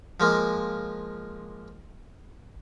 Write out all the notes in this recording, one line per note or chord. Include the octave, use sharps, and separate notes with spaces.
F3 G#3 A#3